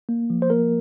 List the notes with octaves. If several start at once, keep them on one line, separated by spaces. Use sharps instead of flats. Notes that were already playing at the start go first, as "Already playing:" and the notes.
A#3
F3
C5
A#3 A#4